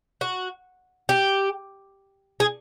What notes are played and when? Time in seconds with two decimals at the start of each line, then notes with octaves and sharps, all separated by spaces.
0.21 F#4
1.09 G4
2.40 G#4